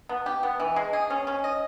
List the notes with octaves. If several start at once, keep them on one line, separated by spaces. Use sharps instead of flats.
B3
G4
B3
E3
G#3
G#4
C#4
C#4
D#5